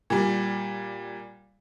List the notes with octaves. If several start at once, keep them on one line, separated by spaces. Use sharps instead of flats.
A#2 G3